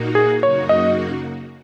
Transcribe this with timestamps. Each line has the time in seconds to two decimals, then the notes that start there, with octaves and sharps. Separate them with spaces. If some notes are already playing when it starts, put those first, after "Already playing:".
Already playing: A#2 A#3 D#4 F#4
0.15 G#4
0.42 F#2 C#3 A#3 D#4 F#4 C#5
0.69 D#5